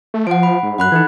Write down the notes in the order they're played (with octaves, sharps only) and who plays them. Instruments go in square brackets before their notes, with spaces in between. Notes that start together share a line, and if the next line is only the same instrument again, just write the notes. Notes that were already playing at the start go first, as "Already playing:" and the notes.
[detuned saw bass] A3
[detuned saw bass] F3 [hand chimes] F#5 D7
[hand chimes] B5
[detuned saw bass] G#2
[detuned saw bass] F#2 [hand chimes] F#5 B5 F#6
[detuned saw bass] E3 [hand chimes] D#4 A4 G#6